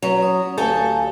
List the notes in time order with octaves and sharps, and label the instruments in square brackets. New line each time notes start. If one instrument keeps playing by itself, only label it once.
[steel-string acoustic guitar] F#3 [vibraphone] C#4 B4
[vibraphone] D#6
[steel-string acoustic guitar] D2 A4 [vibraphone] G4 F5 G#5